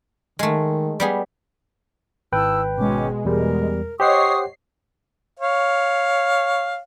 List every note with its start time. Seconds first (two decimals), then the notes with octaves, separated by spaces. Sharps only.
0.39 D#3 G#3 A3
1.00 G3 B3 G#4
2.32 G#1 E4 B4 G5 A5 E6
2.78 B2 G#3 C#4 D6
3.25 E2 G3 A#4
4.00 G4 C5 C#5 D#5 F#5 C#6 D#6 C7
5.39 C#5 F5